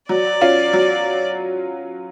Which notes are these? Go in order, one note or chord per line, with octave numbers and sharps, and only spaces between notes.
F#3 D5
C#4 F4
F#3